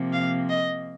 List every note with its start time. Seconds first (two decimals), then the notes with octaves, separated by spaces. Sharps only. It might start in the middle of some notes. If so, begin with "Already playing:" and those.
Already playing: C3 F3 A#3
0.12 F5
0.49 D#5